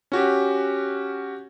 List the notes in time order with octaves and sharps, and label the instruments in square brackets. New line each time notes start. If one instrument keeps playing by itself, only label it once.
[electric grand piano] C#4 F#4 G4